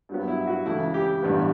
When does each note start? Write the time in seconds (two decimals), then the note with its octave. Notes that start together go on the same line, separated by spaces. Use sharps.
0.09 G2 F#3 B3
0.28 E4
0.41 E4
0.47 F#4
0.66 C#2 C#3 E3 A3 E4
0.94 G4
1.23 A1 G2 E3 B3